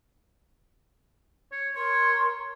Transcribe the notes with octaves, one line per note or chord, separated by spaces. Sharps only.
C#5
A#4 C#5 C6 C#6